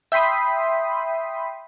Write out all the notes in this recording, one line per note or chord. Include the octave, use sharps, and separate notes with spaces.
E5 G5 B5 C6 D#6